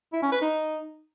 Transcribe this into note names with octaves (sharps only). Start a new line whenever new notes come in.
E4
C#4
B4
D#4